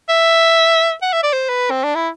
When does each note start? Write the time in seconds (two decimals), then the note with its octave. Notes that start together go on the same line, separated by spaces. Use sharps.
0.09 E5
1.02 F#5
1.13 E5
1.23 D5
1.33 C5
1.49 B4
1.70 C4
1.83 D4
1.95 E4